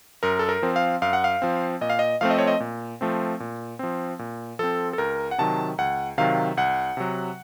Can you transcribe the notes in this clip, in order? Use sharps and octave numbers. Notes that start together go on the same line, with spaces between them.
F#2 A#4
A4
A#4
F3 C4
F5
F#2 F5
F#5
F5
F3 C4
A#2 D#5
F5
D#5
F3 A3 C4 F5
D#5
C#5
D#5
A#2
F3 A3 C4
A#2
F3 C4
A#2
F3 C4 A4
A4
C#2 A#4
F#5
C3 D#3 F#3 A5
C#2 F#5
C3 D#3 F#3 F5
C2 F#5
C3 F#3